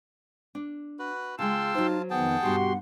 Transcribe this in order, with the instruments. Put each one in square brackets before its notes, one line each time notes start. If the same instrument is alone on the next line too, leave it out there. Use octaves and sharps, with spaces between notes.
[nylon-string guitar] D4
[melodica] F#4 B4
[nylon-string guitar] C#3 G#3 [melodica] F4 A5 [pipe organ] G5 C6 E6
[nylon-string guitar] F#3 C5 [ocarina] D#4
[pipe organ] F2 D#3 B3 [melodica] G#4 G5 A5 [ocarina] F#5
[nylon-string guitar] G2 B2 [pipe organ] F#4 G4 C6